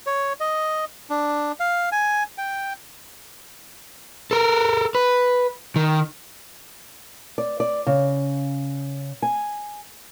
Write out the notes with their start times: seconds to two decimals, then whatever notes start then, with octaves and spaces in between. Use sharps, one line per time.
0.06 C#5
0.40 D#5
1.10 D4
1.60 F5
1.92 G#5
2.38 G5
4.31 A4 A#4
4.95 B4
5.76 D#3
7.38 D5
7.60 D5
7.87 C#3
9.22 G#5